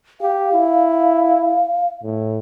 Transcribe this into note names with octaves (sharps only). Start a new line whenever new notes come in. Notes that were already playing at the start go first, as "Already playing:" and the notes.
G4 F5
E4
A2